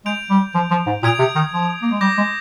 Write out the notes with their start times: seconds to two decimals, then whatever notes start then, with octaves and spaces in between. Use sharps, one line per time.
0.05 G#3 G6 D7 F7
0.30 G3
0.54 F3
0.71 F3
0.86 G#2
1.03 A#2 D#6 G#6 D7 F7
1.19 C3
1.36 D#3
1.52 F3
1.82 A#3
1.91 G#3
2.01 G3 D6 G6 A#6
2.18 G#3